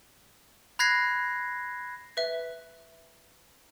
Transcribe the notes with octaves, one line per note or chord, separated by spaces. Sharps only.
B5 F#6 G#6 A#6 C7
B4 E5